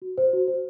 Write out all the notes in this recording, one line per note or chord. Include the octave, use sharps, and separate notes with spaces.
F#4
C5
F#4
C5